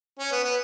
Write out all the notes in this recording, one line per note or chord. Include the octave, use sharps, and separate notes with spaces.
C#4
B3
B3